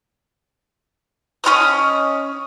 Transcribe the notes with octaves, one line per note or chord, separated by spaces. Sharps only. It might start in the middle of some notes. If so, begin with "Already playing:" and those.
C#4 F4 D#5 D#6